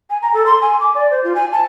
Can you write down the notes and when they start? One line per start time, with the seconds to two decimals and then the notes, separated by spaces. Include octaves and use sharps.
0.10 G#5
0.22 A#5
0.34 A4
0.46 C6
0.62 G#5
0.80 D6
0.95 D5
1.11 C5
1.24 F4
1.35 G#5
1.52 A5